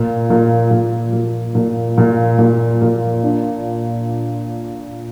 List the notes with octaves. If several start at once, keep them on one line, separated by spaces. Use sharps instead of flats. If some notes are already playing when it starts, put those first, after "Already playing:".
Already playing: A#2
A#2
A#2
A#2
A#2
A#2
A#2
A#2
D4